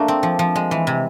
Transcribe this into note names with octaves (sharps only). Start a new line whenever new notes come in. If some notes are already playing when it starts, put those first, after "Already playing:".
Already playing: A3 A#3 D4
C4
F3
F3
G#3
E3
C3